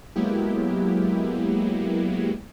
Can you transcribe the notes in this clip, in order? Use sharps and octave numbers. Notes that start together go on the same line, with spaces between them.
F#3 G#3 A#3 B3 E4 G4